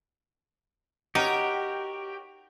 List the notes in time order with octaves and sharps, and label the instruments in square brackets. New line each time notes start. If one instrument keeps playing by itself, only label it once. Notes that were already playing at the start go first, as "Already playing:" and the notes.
[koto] D#4 [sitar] F#4 A#4 C#5 [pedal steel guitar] G4